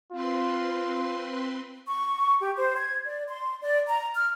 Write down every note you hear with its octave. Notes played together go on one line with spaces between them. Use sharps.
C4 F4 B4 C6
C#6
G4
C5
G#6
D5
C6
D5
A#5
F6